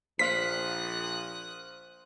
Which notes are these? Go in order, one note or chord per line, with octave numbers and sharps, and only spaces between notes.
A#1 C5 F5 D#6 F#6 B6